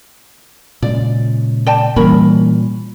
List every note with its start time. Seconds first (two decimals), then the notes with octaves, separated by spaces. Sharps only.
0.82 A#2 C#3 G#3 D5
1.67 D5 G5 A5
1.96 A#2 E3 G3 A#3 C#4 A#4 B5